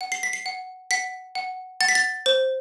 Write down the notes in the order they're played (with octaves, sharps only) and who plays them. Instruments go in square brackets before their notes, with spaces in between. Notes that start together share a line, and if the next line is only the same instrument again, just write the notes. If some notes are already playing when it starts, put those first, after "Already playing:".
[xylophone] F#5
C7
B6
C7
F#5
F#5 B6
F#5
F#5 A6
B6
A6
C5